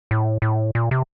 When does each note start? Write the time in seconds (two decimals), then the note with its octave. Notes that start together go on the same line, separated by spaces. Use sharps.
0.11 A2
0.42 A2
0.75 A#2
0.91 C3